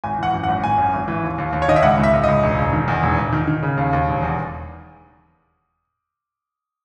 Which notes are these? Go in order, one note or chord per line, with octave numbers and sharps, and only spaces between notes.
G#1 G#5
E3 F#5
F#2
F#5
G#1
G#1 G#5
F#2
G#1
E3
D#2
D#2
D#2
C#5
D#3 D#5
E5
C#2 F#5
C#2
E5
C#2
C#2 D#5
E1
E1
D#3
E2
E1
E1
D#3
D#3
C#3
D#2
D#2
E1
E2